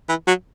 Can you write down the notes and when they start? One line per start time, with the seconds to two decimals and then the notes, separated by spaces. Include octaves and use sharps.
0.09 E3
0.27 F#3